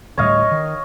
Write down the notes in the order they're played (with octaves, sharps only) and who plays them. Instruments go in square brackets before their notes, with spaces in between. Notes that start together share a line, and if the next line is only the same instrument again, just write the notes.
[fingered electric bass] D2 A2 G3 [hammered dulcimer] C#5 D#5 F5
[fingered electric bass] D#3